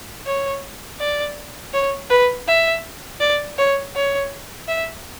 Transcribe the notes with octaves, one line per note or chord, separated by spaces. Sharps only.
C#5
D5
C#5
B4
E5
D5
C#5
C#5
E5